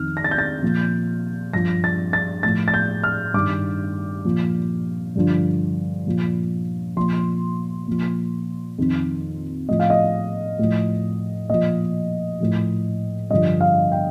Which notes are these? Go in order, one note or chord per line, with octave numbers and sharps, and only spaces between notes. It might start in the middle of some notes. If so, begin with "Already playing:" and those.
Already playing: F2 D#3 F6
A#6
A6
G6
A6
A#2 F3
G2 F3 A#6
A6
A6
A2 F3 A6
A6
G6
F6
G2 D#3 D6
A#2 F3
G2 D3 F3
A#2 F3
A#2 F3 C6
A#2 F3
F2 D#3
A2 F3 D#5
F5
D#5
A2 F3
A#2 F3 D#5
A2 F3
G2 D3 F3 D#5
F5
G5